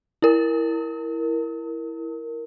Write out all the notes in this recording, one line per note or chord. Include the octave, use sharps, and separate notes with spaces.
E4 A#4